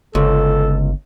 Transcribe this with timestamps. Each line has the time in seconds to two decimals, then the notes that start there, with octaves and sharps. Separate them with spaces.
0.15 G1 C#2 A4